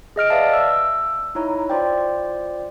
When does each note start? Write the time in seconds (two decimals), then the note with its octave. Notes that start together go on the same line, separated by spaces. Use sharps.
0.16 G#4 D#5 F6 D7
0.30 B4 D5 E5 F5 A5
0.53 E6
1.35 D#4 E4 C#5 A#5
1.70 F4 C5 D5 G5